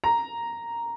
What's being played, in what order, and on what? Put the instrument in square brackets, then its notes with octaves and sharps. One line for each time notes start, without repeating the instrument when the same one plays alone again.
[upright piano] A#5